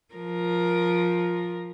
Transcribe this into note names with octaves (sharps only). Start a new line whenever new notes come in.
F3 A#4